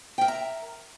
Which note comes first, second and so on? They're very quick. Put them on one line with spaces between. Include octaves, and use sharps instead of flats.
G5 A#4 E5 A#5